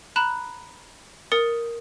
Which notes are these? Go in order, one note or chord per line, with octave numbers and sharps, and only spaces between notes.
A#5 B5 F#6 E7
A#4 D#6 A6 C#7